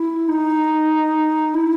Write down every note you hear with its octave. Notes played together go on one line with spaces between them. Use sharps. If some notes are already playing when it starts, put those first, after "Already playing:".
Already playing: E4
D#4
E4